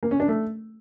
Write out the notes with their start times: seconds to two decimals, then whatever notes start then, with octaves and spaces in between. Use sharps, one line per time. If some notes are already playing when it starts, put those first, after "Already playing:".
0.03 A#3
0.11 C#4
0.20 D4
0.28 A3